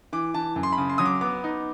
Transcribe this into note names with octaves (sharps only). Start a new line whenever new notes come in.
E3 D6
E3 A5
F#2
C6
B5
C#3
C6
F#3 D#6
D6
B3 D6
D#4